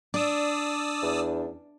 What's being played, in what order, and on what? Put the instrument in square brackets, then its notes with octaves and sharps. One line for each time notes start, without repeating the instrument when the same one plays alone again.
[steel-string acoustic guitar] D4 [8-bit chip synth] D5 D#6 E6
[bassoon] E2